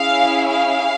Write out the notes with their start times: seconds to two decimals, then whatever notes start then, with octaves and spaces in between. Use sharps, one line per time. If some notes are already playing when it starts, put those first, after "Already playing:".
Already playing: C#4 E4 G#4 F5
0.48 F5